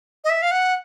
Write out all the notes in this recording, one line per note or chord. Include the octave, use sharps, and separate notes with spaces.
D#5
E5
F5
F#5